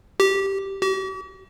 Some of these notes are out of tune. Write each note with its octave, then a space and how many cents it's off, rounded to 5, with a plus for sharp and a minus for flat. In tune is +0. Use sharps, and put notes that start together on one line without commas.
G4 -10
G4 -45